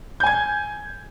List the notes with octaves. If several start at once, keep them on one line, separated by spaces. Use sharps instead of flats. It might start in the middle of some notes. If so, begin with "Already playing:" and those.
G#5 G6 G#6